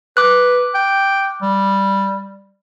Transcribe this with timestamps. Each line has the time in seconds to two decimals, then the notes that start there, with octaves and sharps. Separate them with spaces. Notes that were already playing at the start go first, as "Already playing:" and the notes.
0.17 B4 D6 F#6
0.74 G5
1.42 G3